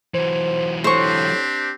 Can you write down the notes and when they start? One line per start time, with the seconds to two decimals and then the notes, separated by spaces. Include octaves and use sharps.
0.14 E3 F#3 C5
0.84 A2 C4 D4 G4 C5 C#6